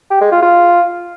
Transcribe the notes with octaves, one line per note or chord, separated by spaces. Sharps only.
G4
G#3
F4
F4